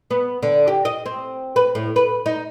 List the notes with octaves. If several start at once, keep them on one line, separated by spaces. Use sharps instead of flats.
B3
D3
G4
D#5
C4
B4
A2
B4
D#4